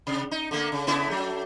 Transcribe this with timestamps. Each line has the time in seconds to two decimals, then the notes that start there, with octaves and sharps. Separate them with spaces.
0.07 C3
0.31 D#4
0.51 D3 A3 A#3
0.72 C#3
0.87 C#3 B3 E4
1.08 F#3 A3